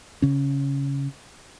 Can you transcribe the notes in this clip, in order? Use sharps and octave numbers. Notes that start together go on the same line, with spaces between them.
C#3 C#4